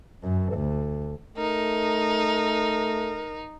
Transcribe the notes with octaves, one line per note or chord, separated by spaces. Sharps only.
F#2
D2
A3 D#4 A#4